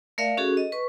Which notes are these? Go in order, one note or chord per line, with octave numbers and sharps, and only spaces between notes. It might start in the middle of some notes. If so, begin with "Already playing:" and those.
A3 A#4 D5 E5 F5
C#4 F#4 G#4 A4
D#5
B4 C#6